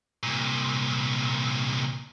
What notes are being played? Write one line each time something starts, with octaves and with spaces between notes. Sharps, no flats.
C2 A#2